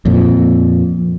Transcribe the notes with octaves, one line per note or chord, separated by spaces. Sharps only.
F2 A#2